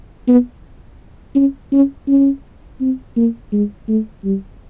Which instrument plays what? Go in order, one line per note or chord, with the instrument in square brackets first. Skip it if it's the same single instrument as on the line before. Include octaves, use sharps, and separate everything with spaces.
[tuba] B3
C#4
C#4
C#4
C4
A#3
G#3
A3
G3